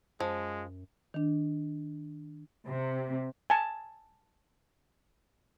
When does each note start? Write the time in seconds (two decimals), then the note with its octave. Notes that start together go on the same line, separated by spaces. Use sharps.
0.20 F#2 F3 G#3
1.14 D#3 D4
2.67 C3
3.50 G#5 A5